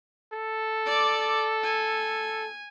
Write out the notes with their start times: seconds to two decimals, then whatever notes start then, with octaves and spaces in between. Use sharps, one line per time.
0.33 A4
0.86 D5 D6
1.64 G#5